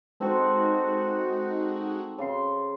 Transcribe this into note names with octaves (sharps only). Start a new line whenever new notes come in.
G#3 C4 D#4 F#4 A4
C#3 C6